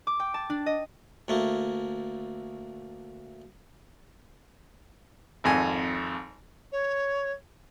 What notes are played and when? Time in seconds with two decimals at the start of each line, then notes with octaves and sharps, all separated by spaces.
0.07 D6
0.20 G5
0.34 A5
0.50 D4
0.66 D#5
1.28 D2 A3 A#3
5.44 G#1 F2 G#5
6.72 C#5